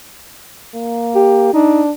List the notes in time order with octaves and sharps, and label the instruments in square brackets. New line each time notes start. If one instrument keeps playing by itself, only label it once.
[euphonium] A#3
[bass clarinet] G4
[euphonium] D4 [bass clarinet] D#4